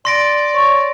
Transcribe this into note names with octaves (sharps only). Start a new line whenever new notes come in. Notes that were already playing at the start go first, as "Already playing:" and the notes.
D5 C6 A#6 D7
C#5